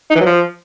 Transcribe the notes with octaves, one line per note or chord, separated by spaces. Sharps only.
D#4
E3
F#3
F3